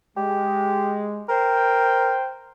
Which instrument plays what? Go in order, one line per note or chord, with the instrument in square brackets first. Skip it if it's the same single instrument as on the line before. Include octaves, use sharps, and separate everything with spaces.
[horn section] G#3 [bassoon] G4
[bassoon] A#4 [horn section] C5 G5